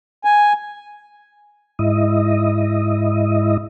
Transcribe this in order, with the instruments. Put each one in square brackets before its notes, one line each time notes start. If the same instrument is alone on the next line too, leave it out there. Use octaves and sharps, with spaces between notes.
[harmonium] G#5
[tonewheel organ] G#2 E4 D#5